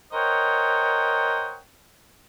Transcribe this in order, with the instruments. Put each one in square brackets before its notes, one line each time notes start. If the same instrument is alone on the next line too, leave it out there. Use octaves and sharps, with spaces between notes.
[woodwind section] A#4 C5 C#5 D#5 F#5 G5